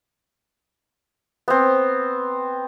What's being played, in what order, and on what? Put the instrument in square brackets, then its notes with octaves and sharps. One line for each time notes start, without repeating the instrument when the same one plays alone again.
[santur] B3 C4